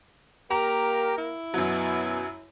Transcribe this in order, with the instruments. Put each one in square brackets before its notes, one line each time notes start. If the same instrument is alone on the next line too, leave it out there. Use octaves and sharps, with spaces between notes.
[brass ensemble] A#3 A#4 [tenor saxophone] G4 [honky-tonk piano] A#5
[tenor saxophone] E4
[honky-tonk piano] F#2 F#3 [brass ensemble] B2 B3